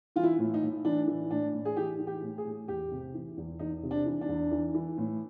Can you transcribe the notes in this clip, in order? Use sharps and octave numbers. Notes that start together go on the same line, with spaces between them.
E3 F4
E4
A2
D#4
A2
E3 D4
E3
A2 D4
A2
G#4
E3 G4
E3
G4
A2
G#4
A2
E2 G4
C3
E3
E2
E2 D#4
C3
D4
E3
D4
E2
E3
E3
A2